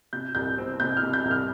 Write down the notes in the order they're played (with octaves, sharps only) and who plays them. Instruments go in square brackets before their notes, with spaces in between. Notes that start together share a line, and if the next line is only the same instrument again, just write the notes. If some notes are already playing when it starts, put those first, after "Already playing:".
[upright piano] C3 G6
C2 G6
C4
C3 G6
F6
C3
G6
C2
F6